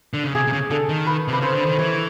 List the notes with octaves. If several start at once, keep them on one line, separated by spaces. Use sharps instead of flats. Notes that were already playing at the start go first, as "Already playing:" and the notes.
D3
C#3
C3 G#4
C3
C#3
D3 A4
D#3
B4
C3 B4
C#3 C5
D3
D#3
E3 C#5